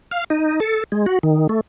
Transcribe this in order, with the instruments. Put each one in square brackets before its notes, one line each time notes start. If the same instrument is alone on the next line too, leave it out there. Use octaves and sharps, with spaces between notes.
[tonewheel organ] F5
D#4
A4
G#3
F#4
D#3
A3